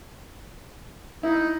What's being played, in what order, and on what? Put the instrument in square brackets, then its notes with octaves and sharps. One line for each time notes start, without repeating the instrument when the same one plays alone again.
[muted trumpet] D#4 [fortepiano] E4